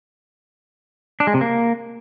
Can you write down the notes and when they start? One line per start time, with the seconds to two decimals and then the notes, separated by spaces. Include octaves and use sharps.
1.20 D4
1.27 G#3
1.34 C3
1.41 A#3